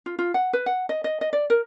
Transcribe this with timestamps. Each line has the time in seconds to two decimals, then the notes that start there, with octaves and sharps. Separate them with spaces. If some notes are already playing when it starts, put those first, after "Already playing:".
0.06 F4
0.19 F4
0.34 F#5
0.53 B4
0.66 F#5
0.89 D#5
1.04 D#5
1.21 D#5
1.33 D5
1.50 A#4